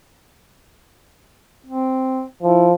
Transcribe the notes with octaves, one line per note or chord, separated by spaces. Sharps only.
C4
F3 E4